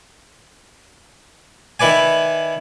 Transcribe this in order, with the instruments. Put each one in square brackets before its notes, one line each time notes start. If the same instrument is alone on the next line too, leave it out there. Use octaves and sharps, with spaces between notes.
[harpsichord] D#3 E4 B4 D5 G#5